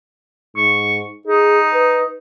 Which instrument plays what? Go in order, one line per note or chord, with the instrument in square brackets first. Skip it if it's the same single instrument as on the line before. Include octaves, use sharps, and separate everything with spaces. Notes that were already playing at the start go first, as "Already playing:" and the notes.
[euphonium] G#2 [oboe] C#6
[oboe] D#4 [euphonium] G#4
[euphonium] B4